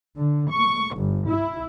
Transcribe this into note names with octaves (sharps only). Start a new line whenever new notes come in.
D3
C#6
G1
E4